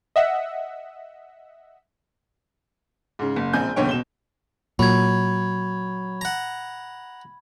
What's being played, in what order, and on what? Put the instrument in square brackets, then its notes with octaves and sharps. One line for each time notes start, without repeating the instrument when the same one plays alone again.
[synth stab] D#5 E5 F#5
[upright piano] G#2 C#3
F#1
E1 A#1 C4 G#5 G6
F#1 B1 E2 D3 C#5 G5
B2 E7 G7
[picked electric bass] A#2 [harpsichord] F#3 [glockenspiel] B5 G#6
[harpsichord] F#5 A#5